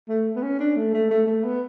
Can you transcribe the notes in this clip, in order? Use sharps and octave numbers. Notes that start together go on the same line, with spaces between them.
A3
B3
C#4
D4
A3
A3
A3
A3
B3